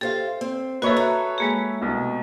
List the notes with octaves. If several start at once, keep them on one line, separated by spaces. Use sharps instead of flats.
G4 A4 C5 F5
C4
A#3 F#4 A4 B4 C#5 D#5 E5
A4 A#5 B5
G#3 A#3 G#4
C2 B2